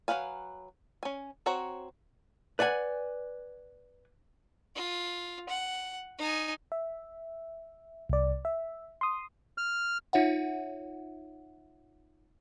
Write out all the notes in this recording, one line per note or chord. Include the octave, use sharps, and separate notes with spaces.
F#3 F4 B4 F5 G#5
C#4 G#5
C4 F#4 C#5 A#5
B4 D5 F#5 G#5
F4
F#5
D#4 G#5
E5
C2 D5
E5
C6 D#6
F6
D#4 F4 C#5 E5 F#5